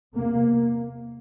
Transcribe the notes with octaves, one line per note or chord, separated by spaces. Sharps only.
E2 C3 A#3